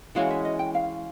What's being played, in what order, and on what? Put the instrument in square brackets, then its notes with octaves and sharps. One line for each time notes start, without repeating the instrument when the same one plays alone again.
[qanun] E3 G#3 C#4 F#4 [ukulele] F5
[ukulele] E5
D#5
G5
F5